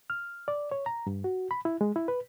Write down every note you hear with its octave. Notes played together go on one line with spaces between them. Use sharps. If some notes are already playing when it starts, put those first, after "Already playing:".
F6
D5
C#5
A#5
G2
F#4
B5
E4
G#3
E4
B4